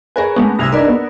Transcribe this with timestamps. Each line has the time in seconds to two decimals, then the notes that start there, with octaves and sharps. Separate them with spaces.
0.16 G#4 A#4 B4 C#5 G#5
0.36 G#3 A3 B3 C#4
0.59 C2 E6 G#6 A#6 F7
0.72 D4 D#4 A#4 B4 D5
0.88 B3